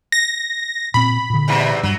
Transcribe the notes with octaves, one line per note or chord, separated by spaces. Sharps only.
A#6
A#2 C4 B5
A#2 D3
E2 G#2 C3
G2 F#3